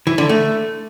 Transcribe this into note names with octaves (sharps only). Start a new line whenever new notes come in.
E3
D3
A3